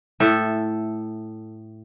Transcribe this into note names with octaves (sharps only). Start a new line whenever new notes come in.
A2 A4 E5